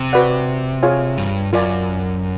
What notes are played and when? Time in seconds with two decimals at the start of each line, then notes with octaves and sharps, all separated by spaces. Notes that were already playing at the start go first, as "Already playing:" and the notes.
Already playing: C3
0.13 F#4 B4 D5 F#5
0.83 F4 G#4 C#5 F5 G#5
1.18 G2
1.53 F#2 F4 A#4 D5 F5 G#5